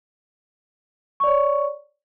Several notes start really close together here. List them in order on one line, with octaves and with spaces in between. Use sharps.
C#6 D5 C#5